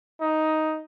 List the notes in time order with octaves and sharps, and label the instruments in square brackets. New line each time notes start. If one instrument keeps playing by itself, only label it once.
[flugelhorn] D#4